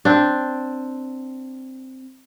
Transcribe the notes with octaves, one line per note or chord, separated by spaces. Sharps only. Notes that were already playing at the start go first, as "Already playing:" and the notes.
C4 D4